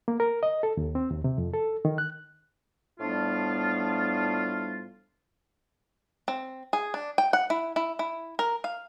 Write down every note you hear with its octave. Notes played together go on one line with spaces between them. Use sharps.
A#3
A#4
D#5
A4
D#2
C4
D#2
C3
F2
A4
D#3
F#6
A2 F3 G3 B3 D4 F4
C4
G#4
D4
G5
F#5
E4
E4
E4
A#4
F5